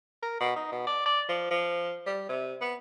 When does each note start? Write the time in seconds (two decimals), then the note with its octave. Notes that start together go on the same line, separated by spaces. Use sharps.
0.22 A#4
0.40 B2
0.56 D#4
0.72 B2
0.87 D5
1.06 D5
1.29 F3
1.51 F3
2.06 G3
2.29 C3
2.61 B3